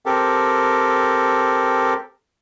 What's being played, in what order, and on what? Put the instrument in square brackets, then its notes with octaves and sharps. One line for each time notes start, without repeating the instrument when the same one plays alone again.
[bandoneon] C4 G4 A4 A#4